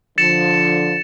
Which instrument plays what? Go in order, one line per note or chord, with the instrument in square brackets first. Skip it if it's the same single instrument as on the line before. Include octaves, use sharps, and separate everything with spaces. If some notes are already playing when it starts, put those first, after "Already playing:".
[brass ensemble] D3 F3 [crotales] A6 C#7 E7